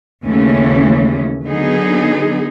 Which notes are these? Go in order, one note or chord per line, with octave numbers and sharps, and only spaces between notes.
D#2 C#3 E3 A3 C#4
D3 F#3 B3 D#4 G#4